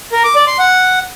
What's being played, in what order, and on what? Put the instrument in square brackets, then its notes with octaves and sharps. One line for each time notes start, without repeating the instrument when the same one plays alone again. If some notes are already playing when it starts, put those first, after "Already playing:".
[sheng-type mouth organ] A#4
D6
D5
C6
F#5